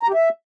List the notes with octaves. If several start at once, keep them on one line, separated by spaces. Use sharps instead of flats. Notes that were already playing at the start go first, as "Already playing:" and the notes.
A#5
G4
E5